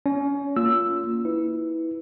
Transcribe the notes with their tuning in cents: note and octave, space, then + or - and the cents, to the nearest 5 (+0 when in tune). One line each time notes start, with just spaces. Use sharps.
C#4 +25 C#5 +35
A#3 +0 F4 +0 E6 +5
E4 -20 B4 +5